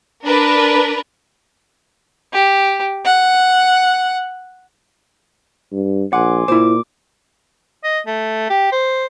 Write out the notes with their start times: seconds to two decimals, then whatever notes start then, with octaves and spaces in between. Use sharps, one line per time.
0.24 D4 A#4 B4
2.33 G4
3.05 F#5
5.72 G2
6.13 A#1 F#5 G#5 C6 D6
6.48 A#2 E4 C5 D6
7.84 D#5
8.07 A3
8.50 G4
8.72 C5